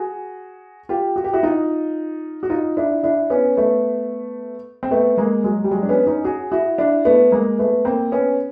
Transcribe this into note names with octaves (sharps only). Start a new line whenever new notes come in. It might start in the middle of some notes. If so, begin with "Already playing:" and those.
Already playing: F#4 G#4
F4 G4
F#4
G4
E4 F#4
D#4 F4
F#4
D#4 F4
D4 E4
D4 E4
B3 C#4
A3 B3
C4
A3 B3
G#3 A#3
F#3 G#3
G3
F#3 G#3
D4
B3 C#4
C#4 D#4
F#4 G#4
E4 F#4
D4 E4
A3 B3
G#3 A#3
A3 B3
A#3 C4
B3 C#4